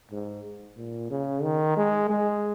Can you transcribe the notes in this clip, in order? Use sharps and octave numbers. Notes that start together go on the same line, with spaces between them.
G#2
A#2
C#3
D#3
G#3
G#3